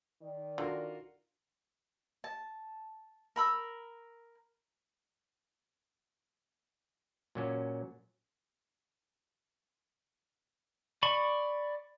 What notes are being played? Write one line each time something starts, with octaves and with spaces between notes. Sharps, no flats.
D#3 D5
D3 F4 F#4 A#4
A5
A#4 B5 E6
A#2 F#3 C#4
D5 B5 C#6